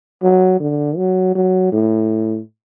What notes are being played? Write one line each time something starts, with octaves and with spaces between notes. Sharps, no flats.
F#3
D3
F#3
F#3
A2